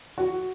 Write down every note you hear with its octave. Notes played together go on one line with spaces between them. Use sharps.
F#4